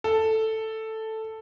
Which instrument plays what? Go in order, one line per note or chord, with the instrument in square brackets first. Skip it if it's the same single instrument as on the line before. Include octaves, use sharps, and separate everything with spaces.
[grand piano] A4